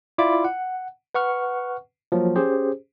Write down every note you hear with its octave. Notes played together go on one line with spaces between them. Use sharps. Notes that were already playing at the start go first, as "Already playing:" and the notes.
E4 F4 D5 B5 D6
F#5
B4 F#5 C#6 F6
F3 F#3 A#3
C#4 G4 G#4 C5